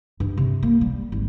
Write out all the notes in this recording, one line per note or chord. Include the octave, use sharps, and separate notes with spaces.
G2
C3
A#3
G3
G#1